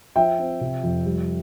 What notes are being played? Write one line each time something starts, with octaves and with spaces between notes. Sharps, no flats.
F3 E5 G5
C4
C3
F2
G3